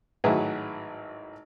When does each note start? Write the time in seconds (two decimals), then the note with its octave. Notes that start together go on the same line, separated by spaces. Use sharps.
0.24 G#1 A2 F#3 E4 G#4 B4